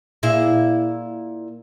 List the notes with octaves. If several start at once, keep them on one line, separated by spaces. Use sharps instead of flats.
A#2 E4 G#4